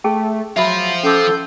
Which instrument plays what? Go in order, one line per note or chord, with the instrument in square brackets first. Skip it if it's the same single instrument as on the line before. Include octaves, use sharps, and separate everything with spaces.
[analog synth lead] A3 [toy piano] G#4 G5 A5
[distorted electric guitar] F3 F4 [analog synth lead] F#3 [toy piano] E5 B5 C6
[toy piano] C#4 D6 [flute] A4 [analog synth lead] G6